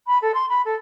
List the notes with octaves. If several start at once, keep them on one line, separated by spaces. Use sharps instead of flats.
B5
A4
C6
B5
A4